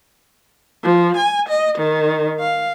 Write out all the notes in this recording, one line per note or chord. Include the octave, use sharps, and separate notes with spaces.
F3
G#5
D#5
D#3
F5